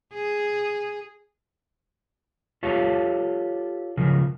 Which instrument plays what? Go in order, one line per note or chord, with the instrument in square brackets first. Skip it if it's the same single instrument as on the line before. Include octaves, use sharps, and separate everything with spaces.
[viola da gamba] G#4
[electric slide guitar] F4 G4 A4 C#5 F5
C#3 F3 A#4